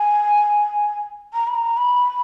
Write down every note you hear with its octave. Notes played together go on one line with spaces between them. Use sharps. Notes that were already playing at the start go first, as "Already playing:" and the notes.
Already playing: G#5
A#5
B5
A#5
B5